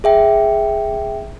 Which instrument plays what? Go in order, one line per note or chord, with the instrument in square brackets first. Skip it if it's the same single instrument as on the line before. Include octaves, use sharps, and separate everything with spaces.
[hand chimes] G#4 E5 G5